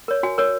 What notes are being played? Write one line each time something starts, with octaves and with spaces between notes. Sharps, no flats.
A#4 C#5
F#4 G#5
A#4 C#5